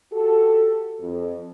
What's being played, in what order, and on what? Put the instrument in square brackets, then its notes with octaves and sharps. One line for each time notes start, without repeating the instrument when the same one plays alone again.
[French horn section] F#4 G4 A4
F2